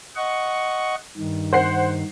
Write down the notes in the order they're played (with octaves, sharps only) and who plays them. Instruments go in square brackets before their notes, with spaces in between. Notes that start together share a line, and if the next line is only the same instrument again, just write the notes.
[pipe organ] D#5 F#5 C#6
G2 D#3
[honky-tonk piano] C5 F#5 C7